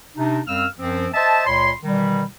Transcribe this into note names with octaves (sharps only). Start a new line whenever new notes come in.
C3 D4 D#4
F#2 G3 C4 F5 E6 F6
F#2 F3 C4
C5 D#5 E5 A5
C#2 A#2 C#5 B5 C6
B2 D#3 E3 G3